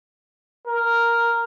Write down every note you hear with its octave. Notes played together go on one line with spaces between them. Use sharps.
A#4